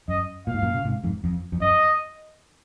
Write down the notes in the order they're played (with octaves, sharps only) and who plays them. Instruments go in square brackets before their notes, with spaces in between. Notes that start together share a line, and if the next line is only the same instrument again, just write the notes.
[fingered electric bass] F#2 [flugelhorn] D#5
[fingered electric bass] A#2 [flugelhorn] F5
[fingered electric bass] G#2
F#2 A#2
C#3
G#2 C3
F2 G#2
F2
F2
[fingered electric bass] F#2 [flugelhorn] D#5